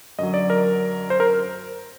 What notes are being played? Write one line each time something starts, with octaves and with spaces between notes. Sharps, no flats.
F#2 D3 F#3 D#5
D5
A#4
C5
A#4